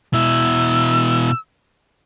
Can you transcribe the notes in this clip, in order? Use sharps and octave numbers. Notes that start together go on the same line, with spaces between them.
B2 E4 E6